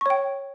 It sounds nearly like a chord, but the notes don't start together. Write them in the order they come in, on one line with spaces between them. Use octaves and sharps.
C#6 C#5 G5